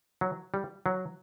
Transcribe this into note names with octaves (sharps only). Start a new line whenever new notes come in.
F#3
G3
F#3